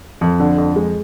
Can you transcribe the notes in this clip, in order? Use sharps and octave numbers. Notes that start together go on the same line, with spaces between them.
F2
D3
F2
G#3